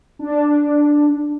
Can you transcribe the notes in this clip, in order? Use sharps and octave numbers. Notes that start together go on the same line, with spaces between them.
D4